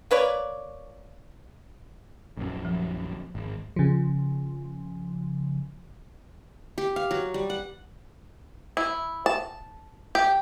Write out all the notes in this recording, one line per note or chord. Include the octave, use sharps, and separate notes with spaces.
A#3 B4 C#5 D5
A#1 F#2
F3
G#1
C#3 F3
G4
F5
F#3
G3
F#5
E4
A5
G4